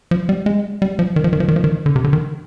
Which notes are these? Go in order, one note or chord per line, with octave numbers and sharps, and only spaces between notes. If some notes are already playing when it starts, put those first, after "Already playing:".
F3
G3
G#3
G3
F3
D#3
F3
D#3
F3
D#3
F3
D#3
D3
C3
D3
D#3